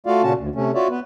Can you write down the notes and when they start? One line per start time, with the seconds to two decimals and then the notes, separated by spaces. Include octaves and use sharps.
0.06 A3 F4 F#4 D5 F5
0.23 A#2 C#3 C#4 F#4 A5
0.38 D2
0.55 C3 A3 C#4
0.74 F4 F#4 C#5 D5 E5
0.90 B3 B4